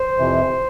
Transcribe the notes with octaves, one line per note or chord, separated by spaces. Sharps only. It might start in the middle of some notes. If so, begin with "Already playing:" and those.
Already playing: C5
F2 C3 E3